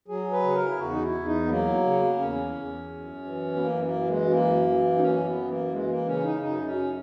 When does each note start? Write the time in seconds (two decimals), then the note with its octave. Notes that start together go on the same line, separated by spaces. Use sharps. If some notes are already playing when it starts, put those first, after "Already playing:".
0.08 F#3 G#4
0.32 B4
0.44 C#3 G#4
0.55 A#4
0.67 E4
0.78 E2 F#4
0.90 D#4
1.02 E4
1.14 E2
1.25 D#4
1.45 B3
1.49 F#3 A#3
1.84 C#3
2.19 E2 C#4
2.54 E2
2.90 F#2
3.25 E3
3.55 B3
3.60 F#2 A#3
3.84 A#3
3.95 E3
4.07 G#3
4.30 F#2 A#3
4.66 E3
4.96 D#4
5.01 F#2 C#4
5.24 B3
5.36 E3
5.48 A#3
5.71 E3 G#3
5.89 A#3
6.06 C#3 C#4
6.24 D#4
6.41 F#2 D#4
6.65 C#4
6.77 F#2